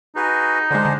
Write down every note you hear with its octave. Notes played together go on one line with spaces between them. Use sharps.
D#4 F#4 G#4 B4
D3 G#3 D4 G#4 C5
D3